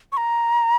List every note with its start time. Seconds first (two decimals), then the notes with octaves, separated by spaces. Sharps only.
0.12 C#6
0.17 A#5